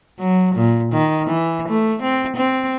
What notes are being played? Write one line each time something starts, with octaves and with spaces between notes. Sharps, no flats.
F#3
A#2
D#3
E3
A3
C4
C4